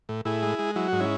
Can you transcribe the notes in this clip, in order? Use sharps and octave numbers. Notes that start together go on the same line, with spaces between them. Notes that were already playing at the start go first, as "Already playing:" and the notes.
A2
A2 E4 G#4
G#3
G#3
F#3 E4
G#2 F#4
C#4 E4